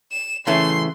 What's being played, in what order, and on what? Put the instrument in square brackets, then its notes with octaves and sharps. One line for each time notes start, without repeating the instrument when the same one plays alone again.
[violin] E7
[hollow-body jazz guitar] C#3 E3 A3 [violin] C6